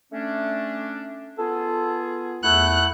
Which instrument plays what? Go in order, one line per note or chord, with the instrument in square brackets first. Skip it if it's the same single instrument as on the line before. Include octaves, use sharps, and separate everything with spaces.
[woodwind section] A3 C#4 D4
[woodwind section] B3 F4 G#4 [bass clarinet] A4
[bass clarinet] E2 [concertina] A3 E4 F#5 [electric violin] F#6